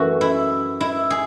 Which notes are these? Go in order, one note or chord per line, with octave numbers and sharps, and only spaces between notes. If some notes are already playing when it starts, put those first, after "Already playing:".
Already playing: F#2 E3 A3 F#4
E4
E4
G#4